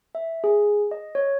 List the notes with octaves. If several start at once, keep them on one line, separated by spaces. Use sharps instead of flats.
E5
G#4
D#5
C#5